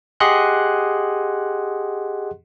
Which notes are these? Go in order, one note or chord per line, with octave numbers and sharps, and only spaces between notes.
G4 G#4 D#5 F#5 C6 F#6